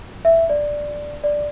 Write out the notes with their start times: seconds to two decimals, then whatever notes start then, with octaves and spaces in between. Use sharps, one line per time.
0.25 E5
0.49 D5
1.24 D5